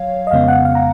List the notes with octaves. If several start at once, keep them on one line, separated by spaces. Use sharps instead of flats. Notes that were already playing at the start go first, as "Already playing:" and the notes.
Already playing: F#3 C#5 F5
D#5
F2 C#3 G#3 B3 F5
F#5
F5
A#5